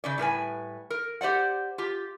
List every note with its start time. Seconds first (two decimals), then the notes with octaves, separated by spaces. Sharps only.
0.04 C#3 C#4 D5
0.18 A2 G3 B4 G#5
0.90 A#4
1.21 G4 C5 D5 F#5
1.78 F4 G4